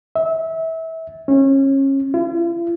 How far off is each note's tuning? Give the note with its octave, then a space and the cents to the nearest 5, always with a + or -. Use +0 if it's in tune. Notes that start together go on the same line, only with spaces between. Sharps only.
E5 -25
C#4 -30
F4 -45